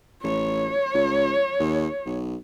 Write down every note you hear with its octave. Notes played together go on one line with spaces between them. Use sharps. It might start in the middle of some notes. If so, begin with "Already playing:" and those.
A1 C#5
C#2
D#2
B1